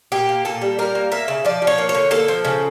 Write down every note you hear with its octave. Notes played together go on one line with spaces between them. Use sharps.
A#2 G4
A#3
A#2 A4
G3
G3 A#4
A#3
A#3 E5
C#3
F3 D5
F3
C#5
A#3
C#5
D3
A#3 A4
F3
C#3